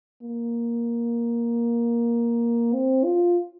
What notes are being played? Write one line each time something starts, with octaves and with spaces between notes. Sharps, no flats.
A#3
C4
F4